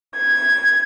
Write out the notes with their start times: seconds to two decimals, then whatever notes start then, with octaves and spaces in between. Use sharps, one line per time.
0.17 G#6